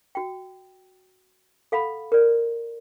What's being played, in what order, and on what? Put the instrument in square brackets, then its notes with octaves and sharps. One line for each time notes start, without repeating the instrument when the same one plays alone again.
[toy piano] F#4 G5
A4 F5 F#5 B5
A#4 D5